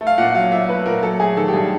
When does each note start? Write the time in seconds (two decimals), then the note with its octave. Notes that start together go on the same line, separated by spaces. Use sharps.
0.01 A3
0.07 F5
0.18 A#2 F#5
0.35 F#3 F5
0.52 A#2 E5
0.69 A3 B4
0.85 A#2 A#4
1.03 F#3 A4
1.20 A3 G#4
1.36 D#3 A4
1.48 G4
1.53 G2 G#4